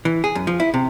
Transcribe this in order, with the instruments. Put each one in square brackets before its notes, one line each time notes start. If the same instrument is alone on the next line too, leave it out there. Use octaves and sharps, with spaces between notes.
[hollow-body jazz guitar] E3
G#4
F#2
F3
E4
C3